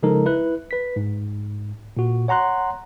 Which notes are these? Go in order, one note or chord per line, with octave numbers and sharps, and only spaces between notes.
C#3 F3 G#3 D#4 A4 A#4
E4 B4 F#6
B4 B6
G#2
A#2 F#4
C#5 F#5 A#5 C6 F#6